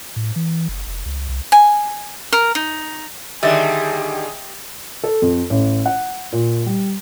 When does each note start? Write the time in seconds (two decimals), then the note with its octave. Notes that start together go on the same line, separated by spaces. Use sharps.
0.16 A2
0.36 E3
0.68 F#1
0.87 F1
1.06 C#2
1.29 C2
1.52 G#5
2.33 A#4
2.55 D#4
3.43 D3 D#3 G3 G4 G#4 D#5 E5 A6
5.04 A4
5.22 F2
5.50 A1
5.86 F#5
6.32 A#2
6.66 G3